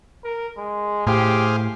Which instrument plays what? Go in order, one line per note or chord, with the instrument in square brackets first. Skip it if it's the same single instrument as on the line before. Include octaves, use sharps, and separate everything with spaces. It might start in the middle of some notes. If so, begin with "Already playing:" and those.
[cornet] A#4
G#3
[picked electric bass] A2 [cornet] G4 [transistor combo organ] G#4 C5 F5